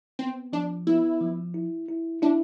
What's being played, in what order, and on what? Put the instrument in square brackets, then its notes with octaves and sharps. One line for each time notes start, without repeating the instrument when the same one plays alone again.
[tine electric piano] B3 [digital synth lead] C4
[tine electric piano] F3 [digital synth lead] D4
[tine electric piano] B3 [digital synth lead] E4
[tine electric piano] F3
E4
E4
[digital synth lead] D4 [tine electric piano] E4